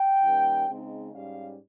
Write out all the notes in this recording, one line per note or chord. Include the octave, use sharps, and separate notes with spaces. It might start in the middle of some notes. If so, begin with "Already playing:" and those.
Already playing: G5
D#3 G3 A#3 C#4
C#3 G#3 C4 D#4
G#2 G3 C#4 F5